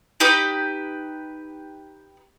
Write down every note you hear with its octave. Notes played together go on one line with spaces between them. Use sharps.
D#4 G4 B4